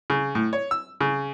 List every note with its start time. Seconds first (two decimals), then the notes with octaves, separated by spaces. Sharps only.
0.10 C#3
0.35 A2
0.53 C#5
0.71 E6
1.01 C#3